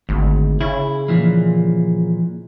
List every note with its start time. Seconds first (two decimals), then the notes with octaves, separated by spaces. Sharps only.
0.09 G#1 D2
0.61 C#3 E4
1.08 A#2 E3 F3